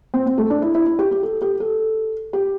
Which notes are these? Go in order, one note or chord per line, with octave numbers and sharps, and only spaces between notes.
C4
C4
A3
D4
E4
E4
E4
G4
G4
A4
G4
A4
G4